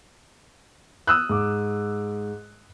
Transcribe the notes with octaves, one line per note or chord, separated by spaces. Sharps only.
D#6 E6 F#6
G#2 D6